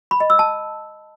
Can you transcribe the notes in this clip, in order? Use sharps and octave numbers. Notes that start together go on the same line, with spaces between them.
B5
D#5
E6
A5